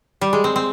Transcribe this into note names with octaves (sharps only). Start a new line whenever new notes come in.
G3
G#3
C4
C4